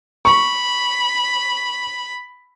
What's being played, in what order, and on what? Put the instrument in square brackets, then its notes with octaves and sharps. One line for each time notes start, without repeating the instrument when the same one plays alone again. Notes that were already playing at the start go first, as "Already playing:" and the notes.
[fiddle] B5 [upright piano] C#6